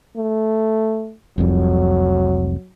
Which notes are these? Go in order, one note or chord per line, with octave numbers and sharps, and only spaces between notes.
A3
F1 C2 F2 F#3